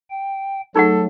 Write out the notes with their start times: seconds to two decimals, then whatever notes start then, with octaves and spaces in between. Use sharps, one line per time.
0.10 G5
0.76 F#3 A3 D#4 G#4 A4 F#5